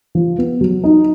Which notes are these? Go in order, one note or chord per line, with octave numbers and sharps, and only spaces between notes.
F3
B3
F#3
D#4